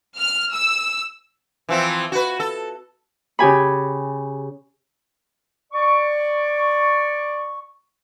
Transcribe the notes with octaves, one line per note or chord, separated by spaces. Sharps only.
F6
E6
E3 F3 C4
F#4 B4
A4
C#3 G4 G#5 B5
D5 C#6